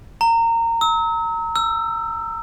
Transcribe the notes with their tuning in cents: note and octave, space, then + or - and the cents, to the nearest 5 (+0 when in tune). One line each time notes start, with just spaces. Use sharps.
A#5 -20
E6 -40
E6 +20